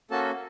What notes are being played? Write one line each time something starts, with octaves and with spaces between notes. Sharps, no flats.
A#3 C#4 F#4 A4 A5